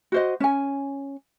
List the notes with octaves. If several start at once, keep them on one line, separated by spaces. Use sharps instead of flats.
F#4 C5 D#5
C#4 G#5